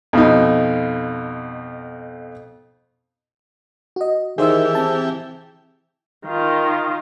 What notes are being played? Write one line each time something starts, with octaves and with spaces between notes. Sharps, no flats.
F2 B2 D#4
F#4 D#5
D#3 E3 E4 G4 G#4 C5 E5 E6
C4 A5
D#3 F4